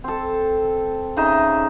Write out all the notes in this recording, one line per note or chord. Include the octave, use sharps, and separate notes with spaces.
C4 A4
C#3 D#4 E5